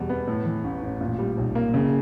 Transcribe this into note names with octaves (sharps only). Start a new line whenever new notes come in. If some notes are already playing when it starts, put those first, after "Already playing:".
Already playing: E2 B2 G3
B3
A2
E3
A1
A1
A#2
G3
B1
A#3
C#3